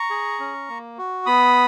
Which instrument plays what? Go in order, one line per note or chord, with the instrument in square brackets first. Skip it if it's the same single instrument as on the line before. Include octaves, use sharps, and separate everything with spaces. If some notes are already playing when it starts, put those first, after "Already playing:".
Already playing: [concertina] A#5 C#6
G#4
C#4
A#3
F#4
B3 B5 D#6